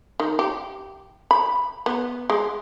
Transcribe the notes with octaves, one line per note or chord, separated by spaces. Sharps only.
D#3
G4
B5
B3
G#3